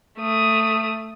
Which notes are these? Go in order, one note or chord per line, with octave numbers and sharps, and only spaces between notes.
A3 D#6